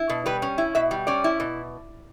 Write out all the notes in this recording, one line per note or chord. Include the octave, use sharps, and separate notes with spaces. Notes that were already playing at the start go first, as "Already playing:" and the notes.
Already playing: E4
B2
G3 B4
C#4
E4
B2 E5
G3
C#4 D5
E4
B2